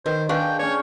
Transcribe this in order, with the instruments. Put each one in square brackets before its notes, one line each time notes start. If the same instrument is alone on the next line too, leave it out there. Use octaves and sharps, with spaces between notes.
[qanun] D#3 [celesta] B4 [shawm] C5
[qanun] D4 [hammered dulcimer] G#4 [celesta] B4 F5 C#6 [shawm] G5
[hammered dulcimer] C#4 D5 [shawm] C#5